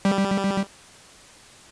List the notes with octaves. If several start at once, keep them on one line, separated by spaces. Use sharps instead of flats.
G3